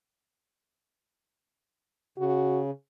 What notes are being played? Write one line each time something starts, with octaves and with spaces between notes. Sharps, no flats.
C#3 F#4